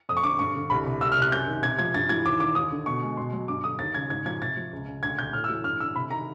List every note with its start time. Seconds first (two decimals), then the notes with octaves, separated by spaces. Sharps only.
0.09 F2 D#6
0.17 C#6
0.24 D3 D6
0.39 G2 C#6
0.56 D3
0.70 C2 B5
0.86 C3
1.01 C2 E6
1.12 F6
1.17 C3 F#6
1.32 F#2 G6
1.47 D#3
1.63 C3 G#6
1.78 F3 G#6
1.94 G2 A6
2.09 E3 G#6
2.25 D#2 D6
2.40 D#3 D6
2.55 D#2 D#6
2.71 D3
2.86 B2 C#6
3.03 G#3
3.17 B2 C6
3.33 F#3
3.48 G2 D6
3.64 D3 D#6
3.79 D#2 A6
3.95 C#3 G#6
4.10 G#2 G#6
4.25 F3 G#6
4.42 C3 A6
4.57 F3
4.73 C#2
4.87 C#3
5.03 D2 G#6
5.18 C3 G6
5.33 A2 F6
5.44 E6
5.49 E3
5.64 G2 F6
5.80 D3 E6
5.96 C3 B5
6.11 D#3 A#5